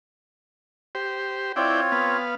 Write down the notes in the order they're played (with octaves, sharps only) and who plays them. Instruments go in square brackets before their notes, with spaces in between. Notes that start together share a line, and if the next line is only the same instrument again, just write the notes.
[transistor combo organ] G4 C5
[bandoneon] C4 F4 C#5 [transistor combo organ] E4 D5 G5
[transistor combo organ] B3 F5